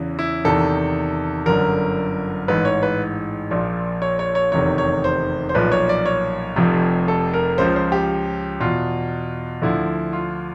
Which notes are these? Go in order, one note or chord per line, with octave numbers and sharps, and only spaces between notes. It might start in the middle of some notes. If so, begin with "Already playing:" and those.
Already playing: E2 C#3 E3
E4
E2 C3 D#3 A4
G1 F#2 D3 A#4
A1 G#2 E3 B4
C#5
B4
A#1 A#2 F3
C#5
C#5
C#5
F1 E2 C3 D#3 C#5
C#5
C5
C5
B1 A#2 F3 B4
C#5
D5
C#5
F1 F2 C3 F3
A4
A#4
C#2 C#3 F3 C5
C5
G4
E2 B2 F4
D2 D3 F3 E4
F4